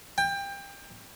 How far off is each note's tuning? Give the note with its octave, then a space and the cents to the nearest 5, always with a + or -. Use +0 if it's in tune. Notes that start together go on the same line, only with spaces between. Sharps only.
G5 +25